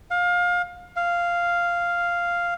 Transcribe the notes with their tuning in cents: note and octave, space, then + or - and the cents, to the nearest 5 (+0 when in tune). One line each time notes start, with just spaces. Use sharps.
F5 +25
F5 -5